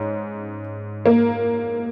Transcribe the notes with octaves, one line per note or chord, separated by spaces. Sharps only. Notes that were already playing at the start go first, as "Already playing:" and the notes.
Already playing: G#2 C#4
A#3